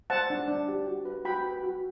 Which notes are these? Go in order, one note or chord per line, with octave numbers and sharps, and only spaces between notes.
C5 F#5 A5
D4
D4
G4
F#4
B4
F#4 G5 B5
B4
F#4